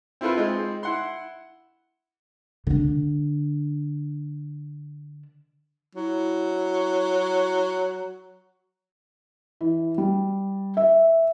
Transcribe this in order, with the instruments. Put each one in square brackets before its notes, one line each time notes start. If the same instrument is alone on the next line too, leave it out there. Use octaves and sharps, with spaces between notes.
[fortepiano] C4 E4 F4 A4 B4
G#3 C4 D#4 F4
E4 F#5 C6
[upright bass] D3 D4
[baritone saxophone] F#3 [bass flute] E4
[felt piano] E3
G3
E5